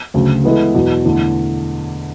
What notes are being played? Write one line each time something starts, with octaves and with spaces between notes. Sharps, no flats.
D2 C#3 F#3
E3 G#3 B3 E4 A4
E2 B2 F#3
E2 D3 A3